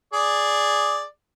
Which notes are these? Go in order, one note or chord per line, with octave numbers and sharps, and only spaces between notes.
G#4 D5